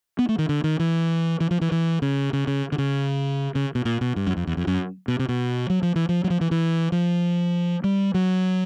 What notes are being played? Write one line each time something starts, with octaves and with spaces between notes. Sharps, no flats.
B3
A3
D#3
D3
D#3
E3
E3
F3
E3
E3
C#3
C#3
C#3
D3
C#3
C#3
B2
A#2
B2
G2
F#2
F2
E2
F2
F#2
B2
C3
B2
F#3
F3
E3
F3
F#3
F3
E3
E3
F3
G3
F#3